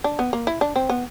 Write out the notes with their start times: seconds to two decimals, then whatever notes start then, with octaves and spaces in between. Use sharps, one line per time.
0.04 D4
0.19 B3
0.33 A#3
0.47 E4
0.61 D4
0.76 C4
0.89 B3